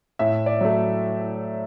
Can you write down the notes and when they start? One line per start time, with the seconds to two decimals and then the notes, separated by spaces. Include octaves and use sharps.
0.19 A2 E5
0.46 D5
0.61 F#3 A3